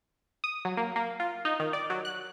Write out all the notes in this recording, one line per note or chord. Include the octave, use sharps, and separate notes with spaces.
D#6
F#3
A#3
A#3
F4
D#4
D#3
D5
F#3
F#6